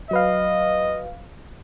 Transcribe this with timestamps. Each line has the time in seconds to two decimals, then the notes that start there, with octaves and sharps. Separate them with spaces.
0.11 F#3 B4 D#5 F5